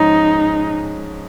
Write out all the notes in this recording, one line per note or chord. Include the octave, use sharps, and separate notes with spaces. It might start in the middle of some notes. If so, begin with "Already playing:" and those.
Already playing: G#2 F3 G#3 C#4 D#4